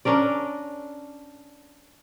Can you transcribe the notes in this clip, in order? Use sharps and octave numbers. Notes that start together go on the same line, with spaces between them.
C#4 D4 A#4 D5